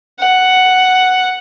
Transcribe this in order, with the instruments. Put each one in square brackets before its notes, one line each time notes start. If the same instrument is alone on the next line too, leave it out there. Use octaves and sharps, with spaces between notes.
[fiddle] F#5